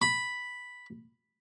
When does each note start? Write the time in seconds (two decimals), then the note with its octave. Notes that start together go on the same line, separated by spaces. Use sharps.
0.02 B5